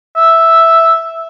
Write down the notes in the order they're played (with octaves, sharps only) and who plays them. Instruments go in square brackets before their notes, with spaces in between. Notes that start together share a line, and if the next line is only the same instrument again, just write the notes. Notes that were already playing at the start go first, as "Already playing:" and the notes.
[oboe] E5